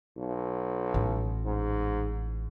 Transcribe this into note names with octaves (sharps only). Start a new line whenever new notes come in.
B1
A1
G#2